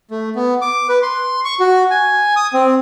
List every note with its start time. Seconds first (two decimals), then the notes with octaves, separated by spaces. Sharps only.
0.11 A3
0.36 B3
0.62 D6
0.89 B4
1.02 C6
1.45 C#6
1.60 F#4
1.91 G#5
2.36 D#6
2.54 C4